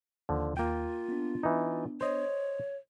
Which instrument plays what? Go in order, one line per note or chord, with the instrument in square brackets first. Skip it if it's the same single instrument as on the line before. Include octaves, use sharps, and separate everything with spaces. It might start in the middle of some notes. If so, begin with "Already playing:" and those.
[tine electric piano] D#2 [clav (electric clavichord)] D3 F3
[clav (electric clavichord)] A#3 G5 [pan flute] F4
[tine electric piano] B3 D4
[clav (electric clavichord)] E3 D#4
[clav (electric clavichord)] C5 D#5 [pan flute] C#5